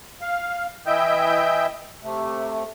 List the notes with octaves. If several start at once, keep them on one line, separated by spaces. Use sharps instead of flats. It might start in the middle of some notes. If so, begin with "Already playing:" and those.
F5
E3 E4 D#5 E5 G5 G6
C3 A3